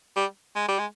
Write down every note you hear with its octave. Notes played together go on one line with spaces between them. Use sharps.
G3
G#3
G3
G#3